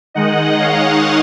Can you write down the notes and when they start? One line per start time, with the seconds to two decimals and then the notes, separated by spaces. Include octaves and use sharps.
0.14 D#3 G#3 D#4 D#5 F#5
0.59 C#5 F5